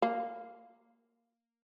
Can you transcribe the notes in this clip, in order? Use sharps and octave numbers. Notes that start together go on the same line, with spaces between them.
A#3